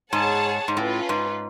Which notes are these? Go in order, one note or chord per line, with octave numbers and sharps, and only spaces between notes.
G#2 G#4 C#5 F#5 A5
G#2
A2 C#4 F4 B4
G#2